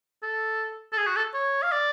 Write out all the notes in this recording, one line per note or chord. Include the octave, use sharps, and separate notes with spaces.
A4
A4
G#4
F#4
A4
C#5
F5
D5